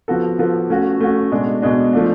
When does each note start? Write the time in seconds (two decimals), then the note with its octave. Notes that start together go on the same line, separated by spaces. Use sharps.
0.08 F3 B3 F#4 A4
0.39 F3 B3 F#4 A4
0.70 A3 C#4 F#4
1.00 A3 C#4 F#4
1.32 B2 G#3 D4
1.62 B2 G#3 D4
1.93 F3 A3 D4